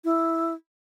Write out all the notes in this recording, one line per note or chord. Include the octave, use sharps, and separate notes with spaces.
E4